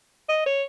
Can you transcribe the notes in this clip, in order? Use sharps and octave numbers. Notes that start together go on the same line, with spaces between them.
D#5
C#5